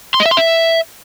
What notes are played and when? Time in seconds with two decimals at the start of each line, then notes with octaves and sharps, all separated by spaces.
0.14 C6
0.20 D#5
0.26 E5
0.31 C6
0.37 E5